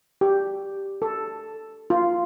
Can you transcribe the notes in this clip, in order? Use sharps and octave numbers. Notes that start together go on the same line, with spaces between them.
G4
A4
F4